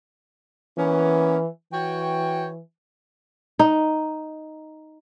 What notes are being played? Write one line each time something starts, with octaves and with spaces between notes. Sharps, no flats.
E3 A#3 B3 C#4
E3 F#4 C#5 G5
D#4